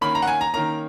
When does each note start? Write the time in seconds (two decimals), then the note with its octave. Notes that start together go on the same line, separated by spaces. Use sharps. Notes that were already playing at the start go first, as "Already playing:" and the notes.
0.01 D#3 A#3 C#4 B5
0.15 A#5
0.22 F#5
0.27 G#5
0.41 A#5
0.54 D#3 A#3 C#4 A#5